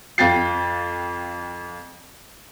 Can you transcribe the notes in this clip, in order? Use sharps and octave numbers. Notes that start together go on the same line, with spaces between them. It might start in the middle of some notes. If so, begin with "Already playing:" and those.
F2 F5 G5 A6 C7